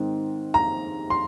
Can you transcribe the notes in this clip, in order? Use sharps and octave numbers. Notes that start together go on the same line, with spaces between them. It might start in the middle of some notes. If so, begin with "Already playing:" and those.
Already playing: G#2 D#3 C4
A#5
C6